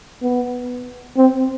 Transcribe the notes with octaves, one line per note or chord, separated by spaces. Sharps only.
B3
C4